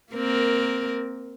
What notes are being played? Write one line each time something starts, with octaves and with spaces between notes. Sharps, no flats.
A#3 C4 A#4